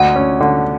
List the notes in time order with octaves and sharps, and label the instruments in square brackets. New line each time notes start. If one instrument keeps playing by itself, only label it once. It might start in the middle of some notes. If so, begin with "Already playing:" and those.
Already playing: [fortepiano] D2 [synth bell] F#5
[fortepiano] C#4
D3